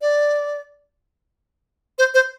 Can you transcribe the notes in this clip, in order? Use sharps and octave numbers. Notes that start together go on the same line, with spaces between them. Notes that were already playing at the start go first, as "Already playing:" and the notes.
D5
C5
C5